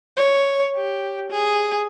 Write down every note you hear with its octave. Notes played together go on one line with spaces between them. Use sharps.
C#5
G4
G#4